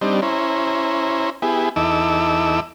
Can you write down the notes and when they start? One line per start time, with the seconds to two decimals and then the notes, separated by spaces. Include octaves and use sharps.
0.01 G3 C4 D4 D#4
0.22 C#4 E4 C5 A#5
1.42 B3 E4 G4 G#4
1.76 E2 D#4 E4 A4 D6 E6